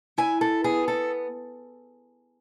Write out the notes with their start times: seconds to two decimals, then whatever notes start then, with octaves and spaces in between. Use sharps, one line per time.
0.18 E4 G#5
0.41 A4
0.64 B3 G#4
0.88 A4